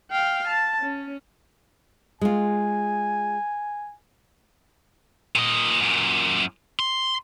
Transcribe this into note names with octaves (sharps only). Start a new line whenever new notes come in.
F5 G5
A5
C#4
G#3 F4 G#5
A#2 D#5
F#2 A#2
C6